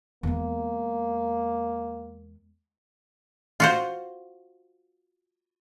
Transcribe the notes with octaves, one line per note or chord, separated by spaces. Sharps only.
E2 G#3 A#3
F4 F#4 C5